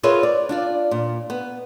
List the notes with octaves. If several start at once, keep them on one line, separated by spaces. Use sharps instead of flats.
F4 G#4 A#4 B4 C#5 E5
D5
D4 F4 D5
A#2
B3